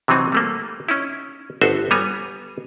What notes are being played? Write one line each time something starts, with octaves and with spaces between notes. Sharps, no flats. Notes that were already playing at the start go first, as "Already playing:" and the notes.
C3 E3 F#3 C4 D#4
G3 A3 A#3
C#4 D#4 E4
G1 F#4 A4 C5 E5
G3 B3 C#5 G#5 A#5